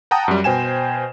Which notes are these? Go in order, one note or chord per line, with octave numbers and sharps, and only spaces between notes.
F#5 G5 A5 A#5 D#6
F#2 G3
B2 C5 G5 G#5 E7